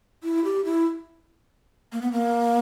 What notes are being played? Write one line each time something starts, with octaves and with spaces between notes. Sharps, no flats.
E4
G4
E4
A#3
B3
A#3